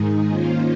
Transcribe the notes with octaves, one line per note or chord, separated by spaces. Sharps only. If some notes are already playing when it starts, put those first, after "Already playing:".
Already playing: G#2 D#3 G#3 D#4 G#4
D#3 A#3 C#4 F4 C5